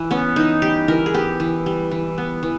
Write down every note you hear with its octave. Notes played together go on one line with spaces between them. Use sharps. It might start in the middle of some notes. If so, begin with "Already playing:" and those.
Already playing: E3
B3 C#4
E3 D#4
G3 G4
E3 A#4
G#4
B3 G4
E3
G3
E3
B3
E3